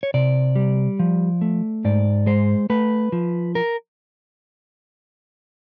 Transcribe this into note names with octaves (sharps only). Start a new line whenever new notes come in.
C#5
C3 D5
G3
F3
A3
G#2 D5
G#3 C5
A3 B4
F3
A#4